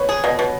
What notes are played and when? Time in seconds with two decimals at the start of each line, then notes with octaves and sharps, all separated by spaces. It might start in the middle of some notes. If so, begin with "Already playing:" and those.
Already playing: B4 C#5
0.09 G#4
0.24 B2 D#5
0.39 B2